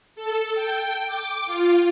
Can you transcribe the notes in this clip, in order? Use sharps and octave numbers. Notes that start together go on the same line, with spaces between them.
A4
G5
D6
F4